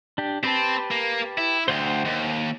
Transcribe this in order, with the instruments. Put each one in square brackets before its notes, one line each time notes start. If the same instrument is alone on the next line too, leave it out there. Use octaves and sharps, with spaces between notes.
[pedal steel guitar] D4 G4
[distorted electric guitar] C4 [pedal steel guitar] G4 B4 A5
[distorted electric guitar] A#3
E4
[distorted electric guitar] D2 [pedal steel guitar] C5 F#5 G5
[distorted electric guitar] D#2